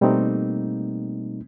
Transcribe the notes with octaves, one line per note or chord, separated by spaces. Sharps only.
B2 G3 A3 A#3 C4 D#4